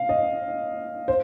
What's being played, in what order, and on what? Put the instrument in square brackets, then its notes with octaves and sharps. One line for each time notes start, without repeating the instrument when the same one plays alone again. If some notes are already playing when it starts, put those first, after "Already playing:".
Already playing: [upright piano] F5
D#5
C5